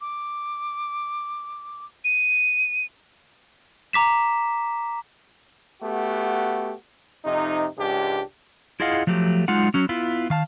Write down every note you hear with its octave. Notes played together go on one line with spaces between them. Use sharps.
D6
D#7
A#5 D6 B6 E7
A3 B3 F#4 G4
F2 C3 D#4
C#2 G#2 D4 G4
E4 F4 G#4 D#5 F5 F#5
F3 F#3 A3 G4
F#3 G#3 D#4 F4 F#5
F#3 C#4
B3 E4 F4
D#3 F5 A5